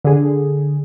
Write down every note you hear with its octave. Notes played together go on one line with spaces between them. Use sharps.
D3 G#4